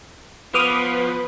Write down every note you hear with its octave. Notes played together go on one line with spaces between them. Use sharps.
F3 B3 B4 D6 D#6 F6